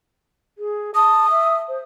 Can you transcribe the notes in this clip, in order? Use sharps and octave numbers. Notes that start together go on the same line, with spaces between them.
G#4
A5 D#6
E5
C5